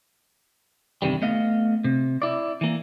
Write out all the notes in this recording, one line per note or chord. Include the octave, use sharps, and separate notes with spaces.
E2 G2 C3 D#3 G3
A3 B3 D#5 F5
C3
E4 D5
E3 A#3